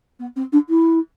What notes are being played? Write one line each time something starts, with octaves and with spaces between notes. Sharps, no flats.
B3
C4
D4
E4